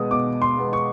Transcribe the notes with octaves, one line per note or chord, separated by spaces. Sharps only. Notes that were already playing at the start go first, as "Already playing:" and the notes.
Already playing: B2 G#3 B3 D#6
B2 D6
C6
G#3 B3
C#6